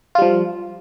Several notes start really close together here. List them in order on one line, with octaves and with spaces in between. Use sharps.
F4 G3 F3